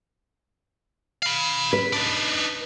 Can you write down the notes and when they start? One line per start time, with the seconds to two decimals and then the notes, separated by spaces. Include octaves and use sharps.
1.23 F5 B5
1.73 B4
1.93 D4 D#4